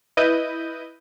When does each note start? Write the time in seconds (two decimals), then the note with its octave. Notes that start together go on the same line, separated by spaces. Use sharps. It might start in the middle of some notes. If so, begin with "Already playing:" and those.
0.17 E4 B4 D#5 G6 D#7